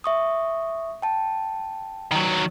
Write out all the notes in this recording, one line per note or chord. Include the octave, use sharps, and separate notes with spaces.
E5 C#6 D#6
G5 A5
D#3 F#3